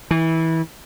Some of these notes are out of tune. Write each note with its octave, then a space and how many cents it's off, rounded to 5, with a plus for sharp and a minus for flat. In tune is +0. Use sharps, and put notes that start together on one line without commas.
E3 -20